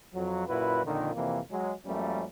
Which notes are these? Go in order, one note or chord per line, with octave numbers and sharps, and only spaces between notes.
F2 F#3
F#2 A#2 E4 F#4 B4
F2 A#2 D3 D#3
F2 C3 E3 A#3
F#3 G#3
F#2 F3 G3 A3 A#3 C#4